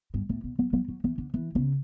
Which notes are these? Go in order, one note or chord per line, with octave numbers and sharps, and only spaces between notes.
G2
A2
B2
F#3
F#3
F#3
E3
D3
E3
C#3